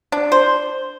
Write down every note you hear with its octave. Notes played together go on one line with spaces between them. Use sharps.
D4
C5